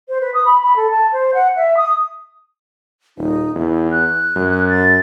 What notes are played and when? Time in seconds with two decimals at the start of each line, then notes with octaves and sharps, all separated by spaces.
0.08 C5
0.20 B4
0.34 D#6
0.45 B5
0.61 B5
0.75 A4
0.90 A5
1.12 C5
1.34 F#5
1.56 E5
1.76 D#6
3.18 D#1 D#4
3.56 E2 E4
3.91 F#6
4.36 F#2
4.69 A6